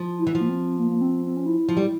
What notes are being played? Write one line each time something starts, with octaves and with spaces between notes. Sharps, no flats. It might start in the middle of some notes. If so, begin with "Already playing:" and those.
Already playing: F3
E4
E3
F3
A#3
C4
A#3
A#3
C4
C4
C#4
E4
F3
G3